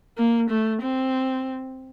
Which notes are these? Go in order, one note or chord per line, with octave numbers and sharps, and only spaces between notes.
A#3
A3
C4